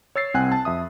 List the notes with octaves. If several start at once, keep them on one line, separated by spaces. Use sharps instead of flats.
C#5 E6 A6 C7
C2 C4 C5 F#5 G#5 F#6
A5
F2 E5 D#6